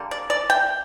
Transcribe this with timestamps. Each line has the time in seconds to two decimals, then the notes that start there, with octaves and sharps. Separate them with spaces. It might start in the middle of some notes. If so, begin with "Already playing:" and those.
Already playing: D3 G3 A#3
0.11 D5
0.30 D5
0.50 G5